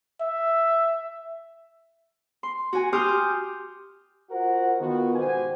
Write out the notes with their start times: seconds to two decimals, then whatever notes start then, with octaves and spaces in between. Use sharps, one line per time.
0.21 E5
2.43 C6
2.73 F#4 G#5
2.93 G4 C6 D#6 F6 G6
4.30 F4 F#4 A#4 C5 F#5
4.79 D#3 B3 F4 F#4
5.16 G#1 B2 G4 C5 F#5 G#5